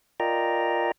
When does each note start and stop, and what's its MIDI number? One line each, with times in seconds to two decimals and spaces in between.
0.20 0.92 65
0.20 0.92 70
0.20 0.92 74
0.20 0.92 75
0.20 0.92 79
0.20 0.92 82